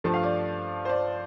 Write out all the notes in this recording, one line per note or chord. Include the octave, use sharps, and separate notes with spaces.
G2 F3 A3 A5
F5
D5
C5
D5